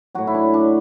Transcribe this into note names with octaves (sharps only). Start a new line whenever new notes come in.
A2 F#3 F#4
E4
D4
D4